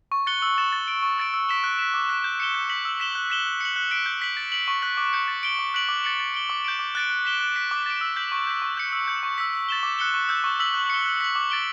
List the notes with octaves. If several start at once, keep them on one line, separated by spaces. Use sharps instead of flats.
C#6
F#6 A6 C#7 G7
E6
A6 E7
A6
D7 G7
C#6
E6 A6 D7
E6
B6 E7 G7
F#6
B6 E7
D6
F#6 B6
G6
C#7 E7 G7
G6
B6 F#7
E6
B6 E7 G7
F#6
B6 E7 G7
F#6
C#7 F#7
F#6
B6 D7
G6
B6 F#7
A6
D7 F#7
C#6
F#6 B6 F#7
D6
G6 C#7
A6
D7 G7
D6
F#6 B6 D7 F#7
D6
A6 C#7 F#7
A6
D7 G7
D6
G6 D7
D6
F#6 A6 D7
F#6
B6 E7 G7
F#6
B6 D7
D6
A6 D7
E6
G6 B6 F#7
C#6
G6 B6
C#6
G6 C#7
E6
G6 C#7
C#6
E6 B6
E6
A6 E7 G7
D6
F#6 C#7 G7
C#6
E6 G6
C#6
E6 B6 F#7
F#6
C#7 G7
F#6
B6 F#7
D6
A6 D7 G7